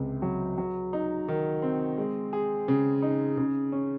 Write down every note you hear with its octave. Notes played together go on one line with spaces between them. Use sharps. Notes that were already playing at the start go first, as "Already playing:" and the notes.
Already playing: C#2 C3 C4
F#3
F#3
D#4
D#3
C4
G#3
G#4
C#3
D#4
C#3
C#4